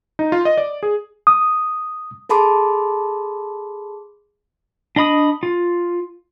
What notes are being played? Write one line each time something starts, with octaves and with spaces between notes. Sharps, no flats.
D#4
F4
D#5
D5
G#4
D#6
G#4 A4 A5 B5 C6 D6
D4 D#5 B5 D#6
F4